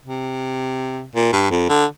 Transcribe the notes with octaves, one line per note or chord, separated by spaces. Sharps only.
C3
A#2
G2
F2
D3